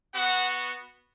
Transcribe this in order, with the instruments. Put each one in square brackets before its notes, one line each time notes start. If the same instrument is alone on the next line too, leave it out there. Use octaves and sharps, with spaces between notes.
[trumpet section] B3 F#4 F#5